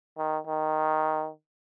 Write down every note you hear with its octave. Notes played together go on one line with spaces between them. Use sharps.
D#3
D#3